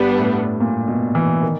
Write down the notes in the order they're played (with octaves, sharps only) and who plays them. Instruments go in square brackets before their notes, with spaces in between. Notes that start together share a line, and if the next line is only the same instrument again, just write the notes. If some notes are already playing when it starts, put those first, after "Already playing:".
Already playing: [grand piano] G2 [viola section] G3 B3 D4
[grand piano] A2
A#2
B2
E3
D#3